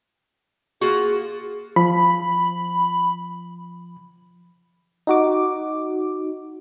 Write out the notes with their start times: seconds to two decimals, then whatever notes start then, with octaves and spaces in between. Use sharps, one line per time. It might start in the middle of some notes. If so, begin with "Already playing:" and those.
0.81 A#3 F4 F#4 G#4
1.76 F3 B5
5.07 D#4 F#4 D6